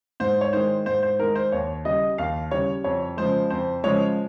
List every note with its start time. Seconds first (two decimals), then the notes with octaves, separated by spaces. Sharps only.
0.20 G#2 C5
0.41 C#5
0.53 D#3 G#3 C5
0.86 G#2 C5
1.03 C5
1.19 D#3 G#3 A#4
1.35 C5
1.52 D#2 C#5
1.85 C#3 G3 D#5
2.18 D#2 F5
2.51 C#3 G3 C#5
2.84 F2 C#5
3.17 C#3 F3 G#3 C5
3.50 F2 C5
3.84 C#3 F3 G#3 C#5